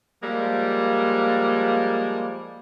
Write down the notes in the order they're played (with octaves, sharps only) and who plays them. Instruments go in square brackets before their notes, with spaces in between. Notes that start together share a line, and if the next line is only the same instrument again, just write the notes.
[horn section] F3 G3 G#3 A#3